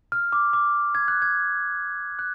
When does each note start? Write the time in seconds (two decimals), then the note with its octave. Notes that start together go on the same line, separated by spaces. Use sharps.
0.12 F6
0.32 D6
0.53 D6
0.95 G#6
1.08 F#6
1.22 G#6
2.19 F#6